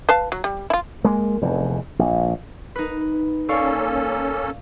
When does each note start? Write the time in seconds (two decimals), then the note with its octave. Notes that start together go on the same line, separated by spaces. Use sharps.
0.09 B4 F5 A5
0.32 F#3
0.44 G3
0.70 E4 F4
1.05 G#3 A#3
1.42 F1 E2
1.99 A#1
2.76 D#4 B4
3.49 A#3 C#4 A4 D5 F5 C#6